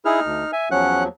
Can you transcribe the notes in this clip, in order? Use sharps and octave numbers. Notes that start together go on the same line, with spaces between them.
D#4 E4 G#4 F6
D2
E5 G#5
E2 F3 F#3 C#4 F#5 F#6